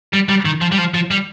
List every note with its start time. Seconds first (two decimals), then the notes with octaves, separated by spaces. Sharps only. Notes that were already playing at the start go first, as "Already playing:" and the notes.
0.13 G3
0.29 G3
0.45 D#3
0.61 F3
0.72 G3
0.78 F3
0.94 F3
1.11 G3